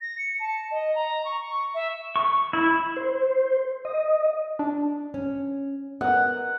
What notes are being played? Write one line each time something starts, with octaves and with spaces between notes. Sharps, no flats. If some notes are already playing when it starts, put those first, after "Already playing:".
A#6
C#7
A5
D#5
A#5
C#6
C#6
E5
C#6
E4
C5
D#5
D4
C#4
B3 A#4 F#5